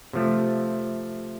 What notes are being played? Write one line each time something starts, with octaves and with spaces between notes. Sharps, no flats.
C3 F3 A3